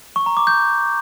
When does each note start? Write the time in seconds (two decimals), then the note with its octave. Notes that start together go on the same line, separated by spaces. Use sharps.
0.16 C#6
0.26 A#5
0.37 D6
0.47 G6